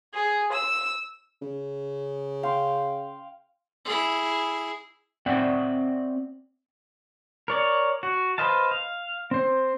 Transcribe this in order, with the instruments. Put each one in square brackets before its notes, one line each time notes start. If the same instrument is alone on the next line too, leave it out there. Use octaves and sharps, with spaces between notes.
[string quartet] G#4
E6
[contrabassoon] C#3
[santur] F5 G5 C6
[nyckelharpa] E4 G#4
[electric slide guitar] C4 D5 E5 F#5 G5
[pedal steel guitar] A#4 C#5 D5
F#4
B4 C5 D#5 F5 A5
F5
C4 C5